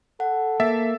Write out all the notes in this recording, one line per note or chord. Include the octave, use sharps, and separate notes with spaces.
A4 F#5
A#3 E5 A6